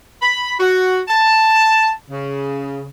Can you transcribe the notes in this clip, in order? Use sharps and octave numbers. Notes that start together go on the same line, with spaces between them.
B5
F#4
A5
C#3